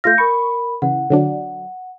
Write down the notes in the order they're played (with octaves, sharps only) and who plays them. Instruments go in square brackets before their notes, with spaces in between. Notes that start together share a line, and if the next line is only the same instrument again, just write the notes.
[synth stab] A3 F4 F5 [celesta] G6 A#6
[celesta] A#4 B5 [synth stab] C#6
[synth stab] C#3 E3 [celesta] F#5
[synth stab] D3 F#3 D4